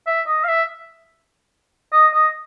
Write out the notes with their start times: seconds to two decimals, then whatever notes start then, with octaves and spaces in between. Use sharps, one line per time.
0.07 E5
0.27 D#5
0.44 F5
0.48 E5
1.93 D#5
2.13 D#5